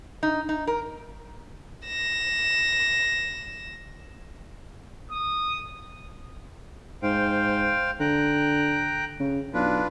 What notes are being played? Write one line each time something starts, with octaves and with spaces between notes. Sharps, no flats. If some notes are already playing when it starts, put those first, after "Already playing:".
D#4
D#4
A#4
A#6 E7
D#6
G#2 C5 F5 G5
D3 G5 A#5 F#6
C#3
B1 D4 F4 B4